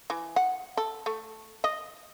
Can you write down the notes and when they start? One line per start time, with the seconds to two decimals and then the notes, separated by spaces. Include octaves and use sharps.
0.10 E3
0.36 F#5
0.77 A4
1.06 A3
1.64 D#5